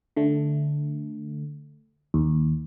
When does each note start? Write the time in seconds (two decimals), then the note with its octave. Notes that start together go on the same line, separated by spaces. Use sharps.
0.17 D3 A3
2.14 D#2